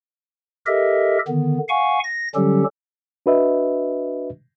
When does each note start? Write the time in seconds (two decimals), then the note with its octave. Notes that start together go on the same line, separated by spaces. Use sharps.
0.66 G4 A4 A#4 D#5 E5
1.27 D3 D#3 B3
1.69 F5 F#5 G#5 C#6
2.04 A#6
2.35 D3 F#3 G3 C#4 G4 A4
3.26 D4 F#4 B4 D#5 E5